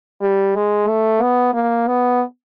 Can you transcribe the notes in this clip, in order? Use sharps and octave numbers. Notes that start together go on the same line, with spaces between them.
G3
G#3
A3
B3
A#3
B3